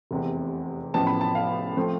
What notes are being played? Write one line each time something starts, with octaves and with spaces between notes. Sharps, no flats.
F1 E2 C3
A1 A2 F3 B3 A5
B5
A5
F5
F3 A3 C4